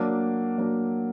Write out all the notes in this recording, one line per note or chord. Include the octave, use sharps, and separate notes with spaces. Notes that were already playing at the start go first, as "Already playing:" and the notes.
Already playing: F#3 A#3 D4
F#3 A#3 D4